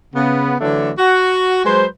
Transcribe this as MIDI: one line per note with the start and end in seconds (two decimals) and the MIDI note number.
0.15 0.55 49
0.15 0.55 59
0.61 0.91 50
0.61 0.91 52
0.61 0.91 54
0.61 0.91 57
0.61 0.91 62
0.98 1.62 66
1.65 1.86 54
1.65 1.86 56
1.65 1.86 71
1.65 1.86 72